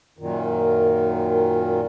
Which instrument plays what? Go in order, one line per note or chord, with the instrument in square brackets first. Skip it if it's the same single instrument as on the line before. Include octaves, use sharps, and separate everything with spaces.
[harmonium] F#2 A#2 D#3